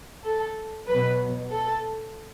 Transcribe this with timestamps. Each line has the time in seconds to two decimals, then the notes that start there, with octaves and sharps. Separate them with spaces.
0.23 A4
0.87 B2 F#3 B4
1.51 A4